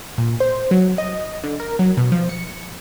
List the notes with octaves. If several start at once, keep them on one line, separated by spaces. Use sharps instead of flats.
A#2
C5
F#3
D#5
D3
A#4
F#3
B2
F3
C#7